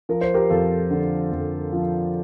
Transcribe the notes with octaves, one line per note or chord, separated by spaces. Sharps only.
F3 A#4
C5
G4 A#4
F2 F4 A4
D3
F2
F3